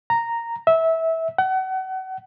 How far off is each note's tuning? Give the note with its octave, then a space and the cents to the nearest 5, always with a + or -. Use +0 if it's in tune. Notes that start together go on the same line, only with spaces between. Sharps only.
A#5 -5
E5 -20
F#5 +35